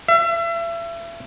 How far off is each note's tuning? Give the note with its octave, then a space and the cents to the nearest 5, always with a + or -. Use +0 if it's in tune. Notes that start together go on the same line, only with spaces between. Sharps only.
E5 +35